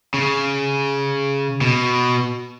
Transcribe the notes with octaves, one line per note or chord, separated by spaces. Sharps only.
C#3
B2